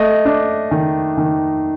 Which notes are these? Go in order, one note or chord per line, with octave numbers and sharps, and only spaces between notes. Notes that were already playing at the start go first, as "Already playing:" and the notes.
Already playing: A3 D#5
D4
D#3
D#3